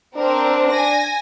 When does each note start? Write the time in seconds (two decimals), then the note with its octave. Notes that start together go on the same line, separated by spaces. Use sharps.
0.17 C4 D4 A#4
0.69 G#5 A#6